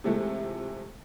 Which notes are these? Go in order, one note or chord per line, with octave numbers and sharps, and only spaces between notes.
C3 E3 F3 G#3 A3 A4